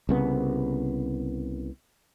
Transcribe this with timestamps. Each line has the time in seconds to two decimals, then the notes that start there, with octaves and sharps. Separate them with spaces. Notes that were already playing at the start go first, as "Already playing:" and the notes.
0.09 C2 C#3 B3